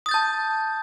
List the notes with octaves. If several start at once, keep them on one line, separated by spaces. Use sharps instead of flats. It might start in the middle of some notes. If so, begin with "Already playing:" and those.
A5 D#6 G6 A6